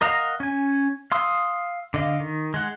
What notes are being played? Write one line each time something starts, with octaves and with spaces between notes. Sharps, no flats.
A#4 D#5 F5 F#5 A#5
C#4 G#5
F5 C6 D#6 E6
D3 D#5 F5
D#3
G#3 F#5